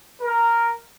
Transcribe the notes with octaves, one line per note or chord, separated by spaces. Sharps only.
A#4